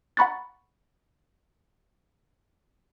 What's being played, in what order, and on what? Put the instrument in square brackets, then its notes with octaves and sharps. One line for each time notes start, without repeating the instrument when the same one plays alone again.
[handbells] F#5 A#5 B5 C#6 F#6 A6